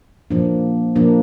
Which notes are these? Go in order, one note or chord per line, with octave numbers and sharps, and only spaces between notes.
A#2 F3 A#3 D4
A#2 F3 A#3 D4